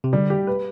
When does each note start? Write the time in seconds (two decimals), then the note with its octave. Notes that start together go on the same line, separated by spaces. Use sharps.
0.04 C3
0.13 D3 G3
0.30 G4
0.47 B4